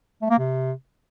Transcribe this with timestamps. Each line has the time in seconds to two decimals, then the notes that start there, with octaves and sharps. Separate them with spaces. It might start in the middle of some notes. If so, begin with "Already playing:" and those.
0.22 A3
0.30 A#3
0.39 C3